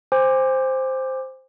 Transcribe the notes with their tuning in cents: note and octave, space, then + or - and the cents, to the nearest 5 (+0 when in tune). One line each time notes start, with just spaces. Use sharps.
C5 +0 G#5 -40 D6 +15